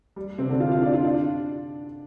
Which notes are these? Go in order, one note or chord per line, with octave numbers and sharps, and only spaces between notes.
G3
C3 C4
D3 D4
F4 F5
F4 F5
D4 D5
F4 F5
D4 D5